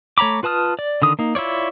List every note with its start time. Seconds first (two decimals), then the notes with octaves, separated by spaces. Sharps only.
0.18 A3 C#5 A#5 B5 D6
0.43 F4 B4 A5 D#6 F6
0.79 D5
1.02 D3 D#3 D#6
1.19 A#3 D#4
1.35 E4 F4 C#5 D5